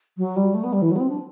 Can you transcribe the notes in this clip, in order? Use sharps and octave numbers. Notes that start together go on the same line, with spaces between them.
F#3
G3
A3
B3
G3
E3
F#3
B3
C4
D4